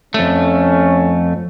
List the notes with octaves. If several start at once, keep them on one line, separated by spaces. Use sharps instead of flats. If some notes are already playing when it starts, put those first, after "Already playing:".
F2 A3 C#4